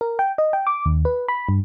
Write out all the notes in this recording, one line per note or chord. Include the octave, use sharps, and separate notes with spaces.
A#4
G5
D#5
G5
D6
D#2
B4
B5
G2